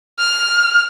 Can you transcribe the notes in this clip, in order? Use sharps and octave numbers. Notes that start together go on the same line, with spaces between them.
F6